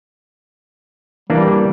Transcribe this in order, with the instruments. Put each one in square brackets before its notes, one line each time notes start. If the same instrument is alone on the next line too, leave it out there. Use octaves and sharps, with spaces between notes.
[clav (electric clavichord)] E3 A#3 D4 [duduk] G3